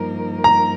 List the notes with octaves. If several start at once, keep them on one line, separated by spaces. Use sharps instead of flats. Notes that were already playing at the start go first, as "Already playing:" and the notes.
Already playing: G2 F3 A#3 D#4 A#4
A#5